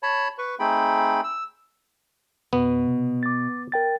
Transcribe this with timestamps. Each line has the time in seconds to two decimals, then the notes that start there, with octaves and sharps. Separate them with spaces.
0.03 C#5 A5 B5
0.38 B4 C#6
0.59 A3 C4 D#4 G#4 G5 B5
1.24 E6
2.53 F2 B2 B3
2.87 C3
3.23 D6 A6
3.72 A#4 G5 A6